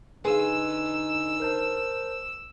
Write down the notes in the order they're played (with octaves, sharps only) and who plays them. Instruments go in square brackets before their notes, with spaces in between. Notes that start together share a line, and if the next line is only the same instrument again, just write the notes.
[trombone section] D3 D#4 [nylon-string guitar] G#4 F5 [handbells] B4 G#5 C6 [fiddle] E6
[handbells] A#4 C5 A5